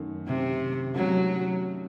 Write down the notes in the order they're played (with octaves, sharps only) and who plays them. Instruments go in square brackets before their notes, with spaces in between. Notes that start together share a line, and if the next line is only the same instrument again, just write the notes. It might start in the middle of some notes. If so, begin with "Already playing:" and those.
Already playing: [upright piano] F#2 D#3 A3
[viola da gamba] C3
[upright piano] C2 C3 D#3 A3 C#4 [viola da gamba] F#3